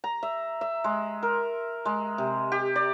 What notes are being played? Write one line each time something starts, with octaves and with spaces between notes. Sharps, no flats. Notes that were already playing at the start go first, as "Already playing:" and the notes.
A#5
E5
E5
G#3
A#4
G#3
C3
G4
D5